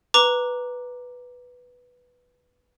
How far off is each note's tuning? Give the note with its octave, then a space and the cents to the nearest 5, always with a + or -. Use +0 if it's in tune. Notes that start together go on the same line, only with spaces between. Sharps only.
B4 +0 A#5 +0 D6 +0